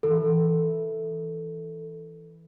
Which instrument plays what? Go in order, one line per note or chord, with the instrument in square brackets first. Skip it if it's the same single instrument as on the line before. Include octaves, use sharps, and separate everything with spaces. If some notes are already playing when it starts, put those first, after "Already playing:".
[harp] E3 [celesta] A4